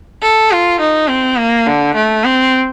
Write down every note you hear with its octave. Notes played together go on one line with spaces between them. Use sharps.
A4
F4
D#4
C4
A#3
D3
A3
C4